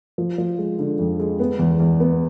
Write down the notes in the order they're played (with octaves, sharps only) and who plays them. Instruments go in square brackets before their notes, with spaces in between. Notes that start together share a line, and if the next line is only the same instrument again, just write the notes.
[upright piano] F3
F3
G#3
D3
F2
G#3
B3
E2
E2
B3